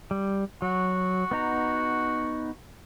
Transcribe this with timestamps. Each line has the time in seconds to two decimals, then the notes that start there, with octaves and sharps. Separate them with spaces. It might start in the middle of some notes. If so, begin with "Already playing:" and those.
0.11 G3
0.62 F#3 F#4
1.31 B3 D#4 A#5